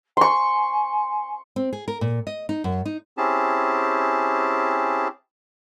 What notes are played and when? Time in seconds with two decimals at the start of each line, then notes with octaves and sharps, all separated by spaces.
0.17 G#5 C6 C#6
1.56 C4
1.73 G#4
1.88 A#4
2.01 A#2
2.27 D#5
2.49 D#4
2.64 F#2
2.85 D#4
3.17 C4 C#4 E4 G4 G#4 A5